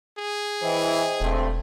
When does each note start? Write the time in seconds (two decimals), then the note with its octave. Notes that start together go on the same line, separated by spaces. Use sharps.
0.18 G#4
0.61 E3 C5 D#5 G5
1.20 E1 G2 A3 C4